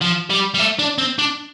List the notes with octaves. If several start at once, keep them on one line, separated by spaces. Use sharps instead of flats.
F3
G3
G3
A3
D4
C4
D4